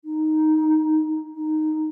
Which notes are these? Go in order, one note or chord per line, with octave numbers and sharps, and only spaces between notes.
D#4
D#4